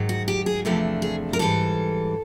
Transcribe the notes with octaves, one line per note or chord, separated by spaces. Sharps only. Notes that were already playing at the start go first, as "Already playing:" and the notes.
Already playing: G#2 D#3 F#3
F#4
G4
G#4
E2 C3 F3 A3 D4 G4
G#4
A#4
G#2 E3 G3 A4